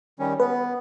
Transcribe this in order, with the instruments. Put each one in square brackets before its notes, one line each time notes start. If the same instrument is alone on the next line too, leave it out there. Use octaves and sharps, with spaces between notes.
[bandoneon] D#3 G3 C#4
[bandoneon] B3 [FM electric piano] B4